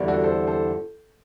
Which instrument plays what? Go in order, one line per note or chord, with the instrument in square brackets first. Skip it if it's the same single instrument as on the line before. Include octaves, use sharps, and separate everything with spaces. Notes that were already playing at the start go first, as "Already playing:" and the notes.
Already playing: [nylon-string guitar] E2 D3 G3 C4
[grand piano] F#4 A4
A4 C5
A4 C5